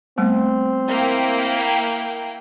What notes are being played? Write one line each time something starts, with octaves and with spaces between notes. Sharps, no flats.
G3 A3 B3 C4
A#3 E4 G5